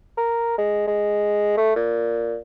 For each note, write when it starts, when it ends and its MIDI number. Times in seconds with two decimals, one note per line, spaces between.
0.17 0.56 70
0.58 0.83 56
0.87 1.52 56
1.57 1.73 57
1.76 2.37 46